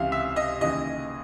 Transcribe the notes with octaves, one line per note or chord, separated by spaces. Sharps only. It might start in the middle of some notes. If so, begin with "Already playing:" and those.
Already playing: C#2 C3 E3 F5
E5
D#5
D#2 C#3 E3 D#5